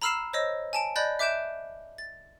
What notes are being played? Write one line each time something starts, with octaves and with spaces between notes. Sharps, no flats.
A#5 B5 E6 F6 C7 E7
C5 C#5 D#5 E6
G#5 A5 D7
D5 D#5 B5 F#6 G6 A6
E5 D6 F#6 G6 D7 E7
A6